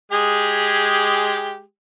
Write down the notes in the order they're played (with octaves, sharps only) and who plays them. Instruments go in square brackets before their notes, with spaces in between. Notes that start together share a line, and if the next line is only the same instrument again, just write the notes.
[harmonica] G#3 G4 G#4